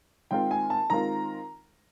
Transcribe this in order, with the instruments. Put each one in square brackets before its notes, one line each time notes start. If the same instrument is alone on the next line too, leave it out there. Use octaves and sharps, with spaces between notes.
[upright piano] D#3 G#3 C4 F4 A#4 [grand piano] G5
[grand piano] G#5
A5
[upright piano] D#3 G#3 C4 F4 A#4 [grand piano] A#5